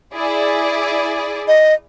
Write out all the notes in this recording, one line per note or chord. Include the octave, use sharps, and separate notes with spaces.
E4 G#4 D5
D#5